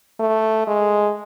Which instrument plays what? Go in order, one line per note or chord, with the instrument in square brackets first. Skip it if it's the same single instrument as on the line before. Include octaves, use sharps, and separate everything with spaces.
[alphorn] A3
G#3